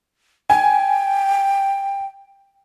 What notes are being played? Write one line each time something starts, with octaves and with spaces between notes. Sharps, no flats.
G5 G#5